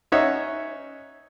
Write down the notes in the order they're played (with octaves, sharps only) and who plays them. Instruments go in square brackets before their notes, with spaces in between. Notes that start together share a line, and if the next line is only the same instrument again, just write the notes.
[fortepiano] C#4 D#4 C#5 E5 F#5